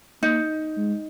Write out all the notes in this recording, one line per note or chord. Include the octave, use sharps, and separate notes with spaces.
A#3 D#4
G#3